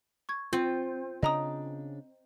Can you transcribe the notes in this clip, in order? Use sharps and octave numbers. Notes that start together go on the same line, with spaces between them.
C#6 G#6
C4 F4
C#3 D4 D#5 A#5 D#6